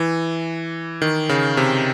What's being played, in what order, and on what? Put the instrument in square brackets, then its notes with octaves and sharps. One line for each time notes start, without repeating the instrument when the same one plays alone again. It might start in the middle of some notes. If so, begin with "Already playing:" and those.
Already playing: [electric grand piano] E3
D#3
C#3
C3